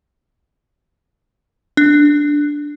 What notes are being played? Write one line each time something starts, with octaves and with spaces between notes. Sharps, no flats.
D4